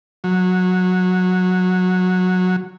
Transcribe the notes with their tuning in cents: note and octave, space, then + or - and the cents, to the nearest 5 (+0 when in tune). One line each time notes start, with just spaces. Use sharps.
F#3 -15